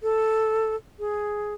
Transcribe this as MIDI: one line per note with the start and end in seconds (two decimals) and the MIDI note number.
0.03 0.76 69
0.99 1.54 68